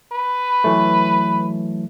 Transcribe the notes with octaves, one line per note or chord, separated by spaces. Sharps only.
B4
E3 F#3 A3